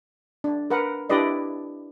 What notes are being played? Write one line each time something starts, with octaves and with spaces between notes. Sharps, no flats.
D4
A#4 B4 F#5
D4 E4 G4 B4 D5 D#5